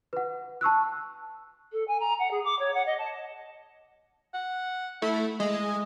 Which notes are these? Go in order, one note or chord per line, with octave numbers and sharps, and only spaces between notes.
B4 F#5
A5 C#6 E6 F#6
A4
G#5
A#5
F#5
G#4
D6
C#5
F#5
D#5
A5
F#5
A3 E4
G#3 D#5